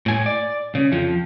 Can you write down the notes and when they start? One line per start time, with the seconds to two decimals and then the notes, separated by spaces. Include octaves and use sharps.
0.06 A2 G#5
0.26 D5
0.75 C#3
0.92 F2 F3